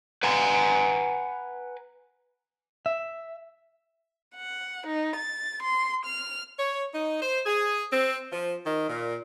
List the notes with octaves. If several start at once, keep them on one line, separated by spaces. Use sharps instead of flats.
B4 F#5 G#5 A#5
E5
F#5
D#4
A6
C6
F6
C#5
D#4
C5
G#4
C4
F3
D#3
A#2